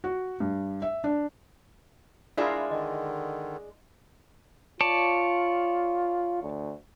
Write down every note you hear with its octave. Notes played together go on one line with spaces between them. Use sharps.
F#4
G2
E5
D4
G#3 D4 E4 F4 G#4 A#4 D5 E5
D3 D#3 D#5
F4 C#5 D5 A5
D2